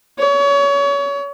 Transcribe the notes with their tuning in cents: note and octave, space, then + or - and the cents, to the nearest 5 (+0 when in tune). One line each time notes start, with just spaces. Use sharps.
C#5 +30